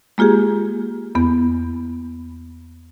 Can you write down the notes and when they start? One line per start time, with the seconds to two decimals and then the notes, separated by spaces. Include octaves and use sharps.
0.18 G#3 A#3 F4 G4 G#4
1.15 E2 B3 B5